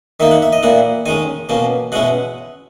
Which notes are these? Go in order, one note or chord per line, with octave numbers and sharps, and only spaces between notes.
D#3 A#3 D#4 E5
F#5
E5
D#5
A#2 A#3 E4 F#5
D#3 G#3 C#4 G#5
B2 A#3 C#4
B2 G#3 C#4 E4 F#5